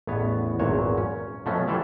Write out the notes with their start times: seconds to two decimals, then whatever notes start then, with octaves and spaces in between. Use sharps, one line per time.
0.07 A1 E2 B3 C#5
0.59 G#1 E2 A#2 F#3 C#5
0.98 C#4
1.46 B2 F3 F#3 A3 C#4
1.67 E3 G3 E4 F4 A4